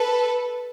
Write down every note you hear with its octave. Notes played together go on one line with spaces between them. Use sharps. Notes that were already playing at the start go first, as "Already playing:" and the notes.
Already playing: A4 B4